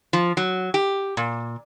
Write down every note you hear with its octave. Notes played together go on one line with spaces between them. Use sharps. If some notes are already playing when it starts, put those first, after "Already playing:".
F3
F#3
G4
A#2